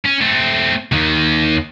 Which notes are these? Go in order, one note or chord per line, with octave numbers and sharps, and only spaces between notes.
C#4
A3 C4
D#2 D#3